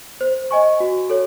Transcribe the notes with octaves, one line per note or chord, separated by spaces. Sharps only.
C5
D#5 G#5 C#6
F#4
A4 C#5